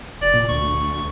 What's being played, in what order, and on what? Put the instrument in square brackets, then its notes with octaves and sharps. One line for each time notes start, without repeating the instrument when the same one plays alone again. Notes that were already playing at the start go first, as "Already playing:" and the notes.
[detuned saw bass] F1 [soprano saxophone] D5
[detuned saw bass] A#2
[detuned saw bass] D2 [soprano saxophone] C#6